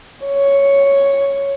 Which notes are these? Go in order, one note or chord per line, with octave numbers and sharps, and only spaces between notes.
C#5